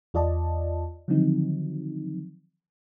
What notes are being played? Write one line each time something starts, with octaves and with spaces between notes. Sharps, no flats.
E2 F4 D5 D#5 A5
D3 D#3 F3 F#3 C4 D#4